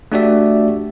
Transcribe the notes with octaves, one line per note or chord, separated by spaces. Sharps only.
A3 D4 F#4 G4 D5 E5